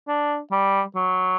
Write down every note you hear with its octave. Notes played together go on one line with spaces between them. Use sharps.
D4
G3
F#3